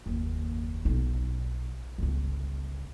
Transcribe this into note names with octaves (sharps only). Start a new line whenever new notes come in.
F#1 D#2
B1 D#4
G1 C#2